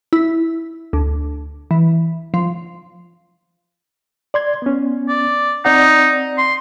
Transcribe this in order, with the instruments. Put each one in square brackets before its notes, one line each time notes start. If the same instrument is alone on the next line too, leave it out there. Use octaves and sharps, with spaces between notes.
[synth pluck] E4
D2
E3
F3
[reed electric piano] D5 C6 G#6
B3 C#4
[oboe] D5
[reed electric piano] C4 D5 F#5 [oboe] D#4
[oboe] C6